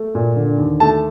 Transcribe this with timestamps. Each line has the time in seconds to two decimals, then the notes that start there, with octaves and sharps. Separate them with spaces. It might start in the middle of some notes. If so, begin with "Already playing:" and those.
Already playing: A3
0.15 A#2
0.36 D3
0.58 D#2
0.80 A3 A5